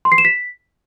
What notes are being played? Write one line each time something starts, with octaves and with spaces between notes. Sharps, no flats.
C6
C7
E7
B6